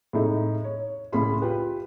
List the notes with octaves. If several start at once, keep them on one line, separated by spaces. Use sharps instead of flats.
A2 C3 G#3 A3 D#4 A4
C#5
C2 A2 C#3 G#4 B5 C6
F4 G4 B4